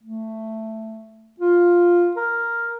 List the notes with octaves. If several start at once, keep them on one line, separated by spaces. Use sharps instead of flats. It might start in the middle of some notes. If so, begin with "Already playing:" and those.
A3
F4
A#4